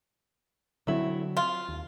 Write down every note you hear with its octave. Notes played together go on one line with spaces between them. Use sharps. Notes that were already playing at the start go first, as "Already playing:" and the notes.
D3 F#3 A3 C4 E4
F4 F5
D#2